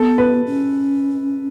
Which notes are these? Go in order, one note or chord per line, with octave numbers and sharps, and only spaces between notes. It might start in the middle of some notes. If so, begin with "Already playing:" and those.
Already playing: B3 A4
B4
C#4